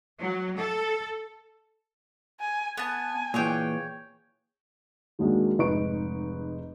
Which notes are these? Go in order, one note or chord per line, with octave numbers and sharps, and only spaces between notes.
F#3
A4
G#5
B3 G#5 A5
A#2 E3 G#4 C#5 G5
D#2 F#3 G#3 A#3 D4
F1 G#2 D#4 B4 C#6 D7